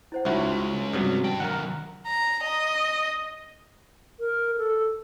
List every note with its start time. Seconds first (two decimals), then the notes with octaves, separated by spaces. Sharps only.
0.12 E4 C5 F#5
0.25 C#2 G#3 C#4 D#4 E4 F#4 E5
0.93 G2 C3 F#3 D#6
1.24 D4 G5
1.40 D#3 F#3 A#4 F#5
2.06 A#5
2.43 D#5
4.20 A#4
4.58 A4